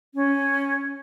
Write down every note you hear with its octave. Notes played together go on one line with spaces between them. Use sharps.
C#4